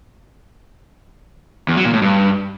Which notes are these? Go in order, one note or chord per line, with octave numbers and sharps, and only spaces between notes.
E2
F#3
A#2
A2
G2